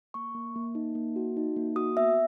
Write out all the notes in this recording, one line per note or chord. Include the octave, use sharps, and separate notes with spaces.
A#3 C#6
A#3
A#3
D#4
A#3
F#4
D#4
A#3
F#4 D#6
B3 E5